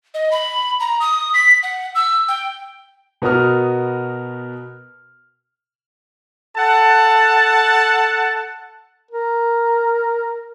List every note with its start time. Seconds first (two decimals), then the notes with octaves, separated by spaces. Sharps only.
0.14 D#5
0.31 B5
0.80 A#5
1.00 D#6
1.34 B6
1.63 F#5
1.95 E6
2.28 G5
3.22 B2 B3 F#4 A#4 D#6 F6
6.57 A4 F#5 A5
9.11 A#4